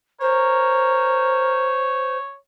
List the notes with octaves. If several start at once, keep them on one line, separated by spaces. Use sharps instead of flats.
A#4 C5 C#5